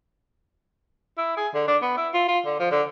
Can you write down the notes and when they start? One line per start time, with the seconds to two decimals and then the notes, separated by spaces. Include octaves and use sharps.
1.18 E4
1.37 G#4
1.54 D3
1.68 D4
1.82 B3
1.97 E4
2.14 F4
2.28 F4
2.46 D3
2.60 F3
2.72 D3